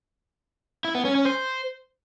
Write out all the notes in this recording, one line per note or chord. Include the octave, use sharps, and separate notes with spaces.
E4
B3
C#4
C#4
C5